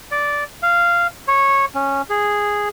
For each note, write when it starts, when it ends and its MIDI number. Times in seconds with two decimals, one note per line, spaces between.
0.11 0.44 74
0.63 1.07 77
1.28 1.65 73
1.75 2.02 61
2.10 2.69 68